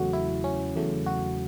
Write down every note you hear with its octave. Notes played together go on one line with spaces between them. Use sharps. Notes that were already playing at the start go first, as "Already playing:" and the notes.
Already playing: E2 C#3 F#3 A3 F#4
E4
C#4
E2 C#3 F#3 A3
F#4